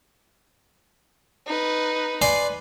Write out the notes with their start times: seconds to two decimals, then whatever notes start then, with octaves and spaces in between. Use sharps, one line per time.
1.47 D#4 B4
2.22 B4 D5 G#5 C6